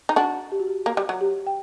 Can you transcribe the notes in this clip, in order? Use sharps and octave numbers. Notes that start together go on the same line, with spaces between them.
D#4
D4 F#4
G4
F#4
G4
A#3
G3
F#3
G4
G5